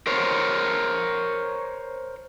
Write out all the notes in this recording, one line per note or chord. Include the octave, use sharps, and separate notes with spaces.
A#4 C5 C#5